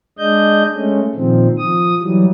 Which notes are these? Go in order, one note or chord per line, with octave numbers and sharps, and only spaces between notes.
G#3 D4 D#5 G6
G#3 A3 C#4
A#2 D#3 F3 C4
F3 D#6
E3 F#3 G3